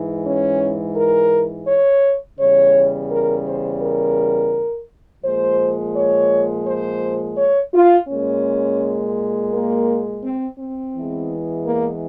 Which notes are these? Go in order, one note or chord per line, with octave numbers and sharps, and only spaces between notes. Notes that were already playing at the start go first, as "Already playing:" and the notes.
Already playing: G#2 E3 G#3
C#4
A#4
C#5
E2 C#3 G3 C#5
A#4
C5
A#4
A#2 F3 G#3 C5
C#5
C5
C#5
F4
A#2 G#3 C#4
A#3
C4
C4
E2 E3 G#3
A#3